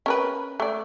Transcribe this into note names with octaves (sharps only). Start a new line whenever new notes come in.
C#4 A#4 B4
A3 D5